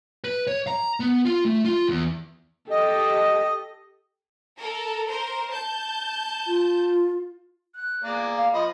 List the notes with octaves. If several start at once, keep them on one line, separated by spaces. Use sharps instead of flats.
B4
C#5
A#5
B3
F4
A3
F4
E2
G4 A4 D#5
A4 A#4
A#4 C5
A5 G6
F4
F#6
A#3 G#4 D5
F5
F3 D#5 B5